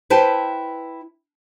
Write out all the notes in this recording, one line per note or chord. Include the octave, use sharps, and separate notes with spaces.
E4 B4 C5 G5 A5